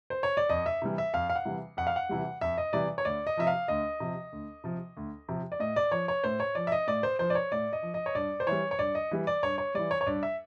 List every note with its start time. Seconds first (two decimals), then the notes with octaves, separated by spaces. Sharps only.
0.10 C5
0.23 C#5
0.37 D5
0.49 F2 D#5
0.66 E5
0.82 C3 E3 G3
0.98 E5
1.13 F2 F5
1.30 F5
1.36 F#5
1.45 C3 E3 G3
1.77 F2 F#5
1.87 F5
1.96 F#5
2.09 C3 E3 G3
2.41 F2 E5
2.58 D#5
2.73 C3 E3 G3 D5
2.98 C#5
3.05 D2 D5
3.27 D#5
3.37 C3 F3 E5
3.47 F5
3.68 D2 D#5
4.00 C3 F3
4.32 D2
4.64 C3 F3
4.97 D2
5.28 C3 F3
5.52 D5
5.60 A2 D#5
5.76 D5
5.92 F3 C#5
6.08 C#5
6.24 A2 C5
6.40 C#5
6.55 F3 D5
6.67 E5
6.72 D#5
6.87 A2 D5
7.03 C5
7.19 F3 C5
7.30 D5
7.35 C#5
7.52 A2 D5
7.73 D#5
7.83 F3
7.94 D#5
8.06 C#5
8.15 G2 D5
8.40 C5
8.47 E3 G3 C#5
8.71 C#5
8.79 G2 D5
8.95 D#5
9.11 E3 G3
9.27 D5
9.43 G2 C#5
9.58 C#5
9.74 E3 G3 D5
9.91 C#5
10.01 C#5
10.06 G2 D5
10.23 E5